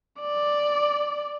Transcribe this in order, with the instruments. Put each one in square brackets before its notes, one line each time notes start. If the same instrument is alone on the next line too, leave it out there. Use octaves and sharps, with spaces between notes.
[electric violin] D5